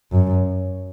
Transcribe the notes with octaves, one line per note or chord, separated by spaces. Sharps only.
F#2